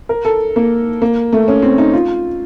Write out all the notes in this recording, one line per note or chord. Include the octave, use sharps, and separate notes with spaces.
A#4
A4
A#3
A#3
A3
C#4
C4
D#4
F4